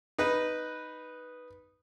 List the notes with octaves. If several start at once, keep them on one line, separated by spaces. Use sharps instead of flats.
D#4 B4